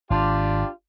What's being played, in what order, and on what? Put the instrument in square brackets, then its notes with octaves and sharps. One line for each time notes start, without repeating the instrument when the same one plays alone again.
[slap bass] G#1 [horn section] D4 F4 G4